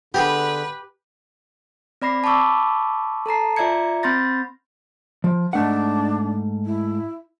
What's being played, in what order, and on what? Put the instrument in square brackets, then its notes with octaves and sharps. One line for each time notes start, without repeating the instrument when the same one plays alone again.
[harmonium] D3 [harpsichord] B3 G#4 [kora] G4 [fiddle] B4
[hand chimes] C4 D5 B5 A#6 C7
A5 B5 C#6 D6 E6
A4 A5 A#5 C7
F4 D5 E5 A#5 G#6 C#7
C4 B5 C6 G6 A6 A#6
[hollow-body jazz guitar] F3
[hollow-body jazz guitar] G#2 A3 F#5 [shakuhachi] D4
[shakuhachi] E4